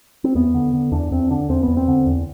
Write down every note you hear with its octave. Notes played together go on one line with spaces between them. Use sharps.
C4
E2 B3
D3
D3
E2 D4
E2 C4
D3 D4
E2 C4
E2 B3
C4
D3
E2